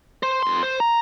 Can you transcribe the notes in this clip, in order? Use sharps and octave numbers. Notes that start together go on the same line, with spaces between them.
C5
F2 C6
C5
A#5